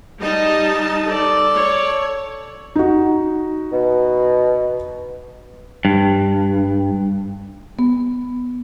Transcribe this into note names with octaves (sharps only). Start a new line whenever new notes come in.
G3 D#4 D#5 A5
A4 D5
C#5
D#4 F#4
B2
G2
B3